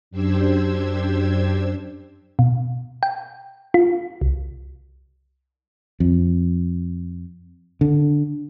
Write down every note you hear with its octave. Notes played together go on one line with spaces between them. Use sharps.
F#2 D4 G4 C5 E6 G#6
B2
G5
F4
C2
F2
D3